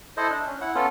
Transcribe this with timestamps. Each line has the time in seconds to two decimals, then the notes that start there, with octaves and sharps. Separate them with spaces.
0.17 E4 A4 C5 D#5
0.30 D4
0.46 C#4
0.61 E4 F#5
0.75 B3 C#4 F4 A4